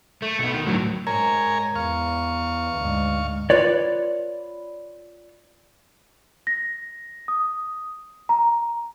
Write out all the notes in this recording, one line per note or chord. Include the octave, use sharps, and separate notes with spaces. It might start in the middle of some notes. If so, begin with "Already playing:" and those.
A3
B1 B3
D#3
A2 F#3
G#2 A#4 C#5 G#5 A#5
E2 F5 C#6
D2 G#2
F4 B4 C#5 D5
A#6
D#6
A#5